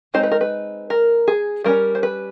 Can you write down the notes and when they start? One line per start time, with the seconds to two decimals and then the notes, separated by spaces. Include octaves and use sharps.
0.14 G#3 C4 D#4 C5
0.23 B4
0.32 A#4
0.41 B4
0.90 A#4
1.28 G#4
1.64 G3 A#3 C#4 A#4
1.95 C5
2.03 B4